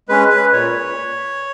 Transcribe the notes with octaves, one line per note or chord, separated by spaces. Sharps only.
G#3 C#4 B4
B4
A#2 C#5